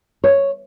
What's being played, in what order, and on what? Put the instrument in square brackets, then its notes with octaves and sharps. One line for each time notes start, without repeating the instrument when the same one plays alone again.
[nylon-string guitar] C#5